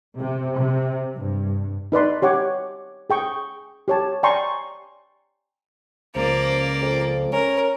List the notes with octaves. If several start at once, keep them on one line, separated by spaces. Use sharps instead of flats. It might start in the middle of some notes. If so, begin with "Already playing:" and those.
C3
C3
G2
D#4 B4 D5 C6
G4 C#5 F#5 D6
G#4 G5 C#6
G4 C#5 A5
D5 G5 G#5 A#5 C6 C#6
C#2 F3 A#3 D5
F2
C#4 A#4